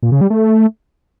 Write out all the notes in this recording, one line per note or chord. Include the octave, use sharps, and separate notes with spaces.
A#2
C#3
G3
A3